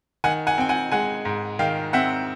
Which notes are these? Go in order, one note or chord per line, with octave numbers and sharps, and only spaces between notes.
D#3 F#5 G#5
F#5 G#5
C4 G5
F#5 G#5
G#3 F#5 G#5
G#2
D#3 F5 G5
C4 E5 F#5